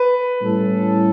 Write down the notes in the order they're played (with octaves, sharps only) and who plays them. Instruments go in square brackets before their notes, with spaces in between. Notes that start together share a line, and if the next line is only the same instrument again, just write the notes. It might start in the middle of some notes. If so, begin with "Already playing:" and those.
Already playing: [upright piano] B4
[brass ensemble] A2 G3 C#4 E4 A4